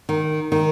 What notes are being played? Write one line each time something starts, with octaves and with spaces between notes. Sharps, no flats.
D#3
D#3